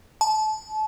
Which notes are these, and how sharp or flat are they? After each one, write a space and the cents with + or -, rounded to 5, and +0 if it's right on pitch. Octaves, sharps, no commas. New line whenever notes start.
A5 -30